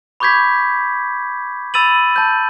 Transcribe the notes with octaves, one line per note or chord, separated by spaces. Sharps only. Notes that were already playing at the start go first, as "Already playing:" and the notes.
B5 C#6 D6 G6 G#6 B6
B5 E6 A6 D#7 F#7
A5 G6